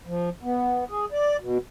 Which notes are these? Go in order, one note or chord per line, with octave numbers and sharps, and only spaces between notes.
F3
B3
G#4
D5
B2